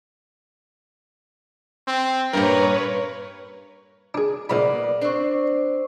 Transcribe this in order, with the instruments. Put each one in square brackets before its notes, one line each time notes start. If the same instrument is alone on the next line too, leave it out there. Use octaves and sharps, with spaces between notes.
[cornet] C4
[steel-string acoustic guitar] G2 A#2 [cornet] A#4 [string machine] B4 C#5
[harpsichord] D4 G#4
[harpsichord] A#1 G#2 B5 [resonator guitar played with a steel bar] A#3 B3 D5
[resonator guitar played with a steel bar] C4 D4 [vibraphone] C5 C#6